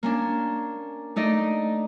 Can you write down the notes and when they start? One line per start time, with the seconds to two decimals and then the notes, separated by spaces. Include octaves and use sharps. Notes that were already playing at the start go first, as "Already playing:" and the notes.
0.03 A#3 C#4 D4
1.16 A3 D#4 D5 D#5